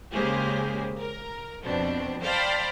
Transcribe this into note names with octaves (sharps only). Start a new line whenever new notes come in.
C#3 G#3 A#3 G4 G#4 C5
A#4
F2 B2 C4 D4
C5 D5 F5 G5 A5 B5